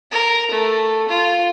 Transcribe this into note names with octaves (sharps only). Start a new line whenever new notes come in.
A#4
A3
F4